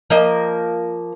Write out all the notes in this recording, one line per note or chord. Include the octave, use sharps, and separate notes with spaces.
F3 A#3 D#5